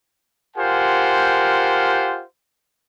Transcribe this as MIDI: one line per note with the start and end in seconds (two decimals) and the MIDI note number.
0.57 2.23 65
0.57 2.23 67
0.57 2.23 70
0.57 2.23 72
0.57 2.23 78
0.57 2.23 80